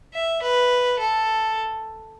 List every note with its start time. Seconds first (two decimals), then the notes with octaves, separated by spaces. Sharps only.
0.14 E5
0.42 B4
0.99 A4